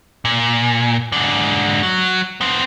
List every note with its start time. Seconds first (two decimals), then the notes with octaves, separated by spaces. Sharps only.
0.25 A#2
1.12 G#2 D3
1.83 F#3
2.41 B3 C4